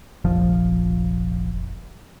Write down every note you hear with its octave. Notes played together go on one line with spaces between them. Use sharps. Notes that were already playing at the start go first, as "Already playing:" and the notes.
F1 A#1 F3